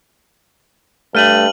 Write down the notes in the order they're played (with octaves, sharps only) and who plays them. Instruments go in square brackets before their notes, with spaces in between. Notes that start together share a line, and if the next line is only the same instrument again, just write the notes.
[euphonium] G2 [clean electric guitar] A3 [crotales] F6 D#7 F#7